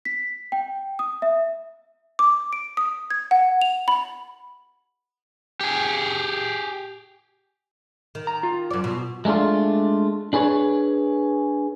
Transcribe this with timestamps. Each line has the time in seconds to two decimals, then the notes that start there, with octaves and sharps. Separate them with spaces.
0.05 B6
0.52 G5
0.99 D#6
1.22 E5
2.19 D6
2.53 D7
2.77 D#6
3.10 G#6
3.31 F#5
3.62 F7
3.88 B5
5.61 G4 G#4
8.15 D#3
8.27 A#5
8.43 F4
8.70 F#2 D5
8.84 B2
9.25 G#3 A3 C#4 D4 F4
10.33 D4 G#4 B4 C#5